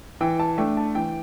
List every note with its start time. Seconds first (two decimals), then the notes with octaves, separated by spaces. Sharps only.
0.21 E3 G5
0.40 A5
0.58 A3 D4 G5
0.77 A5
0.95 E3 G5